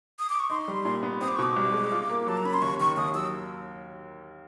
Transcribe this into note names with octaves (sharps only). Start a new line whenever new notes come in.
D#6
D6
C#6
D#4 C6
G3
A#2
B3
C4 D#6
D6
C#6
B2 D6
C2
G#3
F4
A#3
F#3 A5
A#5
C#4 B5
C6
D#2 C#6
D#3 C#6
D#2 D#6
F#3 E6